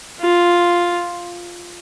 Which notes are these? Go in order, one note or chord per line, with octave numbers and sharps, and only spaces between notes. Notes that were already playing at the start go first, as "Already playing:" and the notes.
F4